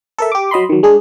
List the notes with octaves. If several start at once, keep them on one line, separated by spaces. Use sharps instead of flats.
A4 A#4 E5
G4 D6
F#3 D#5 B5 C6
D#3 F#3
G#3 D4 G#4